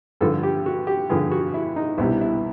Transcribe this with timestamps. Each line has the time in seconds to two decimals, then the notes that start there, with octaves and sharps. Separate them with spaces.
0.21 G2 D3 F3 A4
0.43 G4
0.66 F#4
0.87 G4
1.09 G2 D3 F3 G#4
1.32 F#4
1.54 E4
1.76 D#4
1.98 C2 B2 G3 E4
2.21 E4